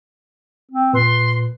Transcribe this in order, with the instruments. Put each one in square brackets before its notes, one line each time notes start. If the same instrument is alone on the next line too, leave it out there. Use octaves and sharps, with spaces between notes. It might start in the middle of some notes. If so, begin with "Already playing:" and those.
[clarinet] C4
[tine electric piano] A#2 [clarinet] B4 [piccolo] C6